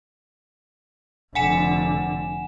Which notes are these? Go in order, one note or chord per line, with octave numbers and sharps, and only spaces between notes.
F1 D3 F#5 G#5 E7